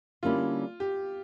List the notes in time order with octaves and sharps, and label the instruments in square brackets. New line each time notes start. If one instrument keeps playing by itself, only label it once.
[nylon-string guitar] D3 G3 A#3 C#4 E4 [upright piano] F4
[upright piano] G4